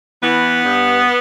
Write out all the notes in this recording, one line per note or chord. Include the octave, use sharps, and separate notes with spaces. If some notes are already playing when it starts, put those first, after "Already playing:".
E3 B3
G2